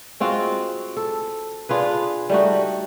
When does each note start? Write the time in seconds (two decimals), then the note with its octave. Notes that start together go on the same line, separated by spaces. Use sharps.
0.20 G#3 C4 F4 F#4
0.97 A4
1.69 D4 F4 G#4 B4
2.30 G3 A3 D#4 F#4